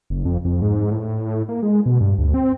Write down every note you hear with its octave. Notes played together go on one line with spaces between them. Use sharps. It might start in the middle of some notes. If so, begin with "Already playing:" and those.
F#1
F2
F2
G#2
A2
A#3
G#3
B2
G2
D2
C4